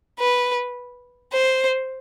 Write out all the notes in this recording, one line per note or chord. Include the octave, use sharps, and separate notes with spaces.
B4
C5